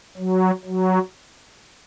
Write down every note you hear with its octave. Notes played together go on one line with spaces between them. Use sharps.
F#3
F#3